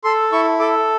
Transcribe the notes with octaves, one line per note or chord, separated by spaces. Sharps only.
A4 C6
E4 C#6
A4 D6